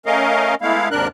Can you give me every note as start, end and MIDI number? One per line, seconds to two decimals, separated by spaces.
0.06 0.55 57
0.06 0.55 61
0.06 0.55 70
0.06 0.55 75
0.06 0.55 77
0.62 0.89 56
0.62 0.89 57
0.62 0.89 59
0.62 0.89 64
0.62 0.89 77
0.91 1.08 39
0.91 1.08 44
0.91 1.08 48
0.91 1.08 62
0.91 1.08 70
0.91 1.08 90